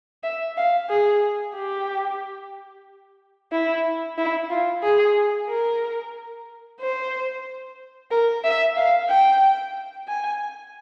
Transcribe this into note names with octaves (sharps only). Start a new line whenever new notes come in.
E5
F5
G#4
G4
E4
E4
F4
G#4
A#4
C5
A#4
E5
F5
G5
G#5